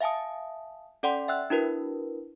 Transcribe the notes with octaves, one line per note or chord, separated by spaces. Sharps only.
E5 F5 G#5 A5 D#6
C#4 A4 D5 F#5 G5 C6
E5 G5 E6 F#6
D4 E4 F#4 A#4 B4